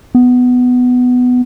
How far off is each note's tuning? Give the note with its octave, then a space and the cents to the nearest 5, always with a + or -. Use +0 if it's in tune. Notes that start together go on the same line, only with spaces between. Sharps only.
B3 +10